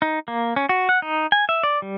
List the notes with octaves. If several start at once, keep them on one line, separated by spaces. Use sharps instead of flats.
D#4
A#3
C#4
F#4
F#5
D#4
G#5
E5
D5
G3